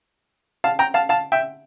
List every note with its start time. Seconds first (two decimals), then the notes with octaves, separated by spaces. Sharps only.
0.64 F5 A5
0.79 G5 A#5
0.94 F5 A5
1.09 F5 A5
1.32 E5 G5